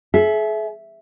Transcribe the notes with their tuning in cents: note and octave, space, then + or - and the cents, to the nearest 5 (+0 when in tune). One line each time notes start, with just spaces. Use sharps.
G#4 +45 E5 +0